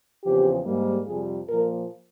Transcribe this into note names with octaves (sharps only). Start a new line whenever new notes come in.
E2 C#3 F3 C4 G4
G#2 G3 A#3
F2 C3 G3 G#4
A#2 F3 A#3 A#4